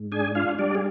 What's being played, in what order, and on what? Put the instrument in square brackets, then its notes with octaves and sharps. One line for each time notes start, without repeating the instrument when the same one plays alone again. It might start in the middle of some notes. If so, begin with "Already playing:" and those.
Already playing: [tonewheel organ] G#2
D4 G#4 G#5
D4 F4 F5
G3 D4 D5
G#4